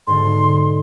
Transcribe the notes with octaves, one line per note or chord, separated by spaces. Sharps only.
G#2 B2 D3 C6